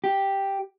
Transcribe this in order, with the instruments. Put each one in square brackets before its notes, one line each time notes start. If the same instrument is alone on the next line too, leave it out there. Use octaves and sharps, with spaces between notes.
[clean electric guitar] G4